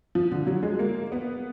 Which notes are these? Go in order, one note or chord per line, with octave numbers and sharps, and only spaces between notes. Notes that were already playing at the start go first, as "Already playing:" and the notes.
F3
D3
F#3
G#3
A#3
B3